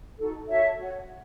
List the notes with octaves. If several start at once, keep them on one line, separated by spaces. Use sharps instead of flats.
D#4 F#4 A4
F#4 A4 C#5 E5
F#4 C#5